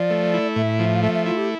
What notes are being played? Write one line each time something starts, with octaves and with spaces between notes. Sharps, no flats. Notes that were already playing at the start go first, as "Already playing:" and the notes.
Already playing: F3 D5
A3
E4
A2 E5
F3
F5
A3 E5
E5
E4 F4
G4